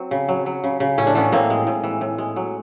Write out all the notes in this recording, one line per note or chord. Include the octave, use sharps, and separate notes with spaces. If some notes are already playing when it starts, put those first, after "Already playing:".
Already playing: F#3 C4
C#3
F#3
F#3
C#3
C#3
A2 C#4
D4
E3 B3 C#4
A2 A#3 C4
G#3
A2
E3
A2
G#3
F#3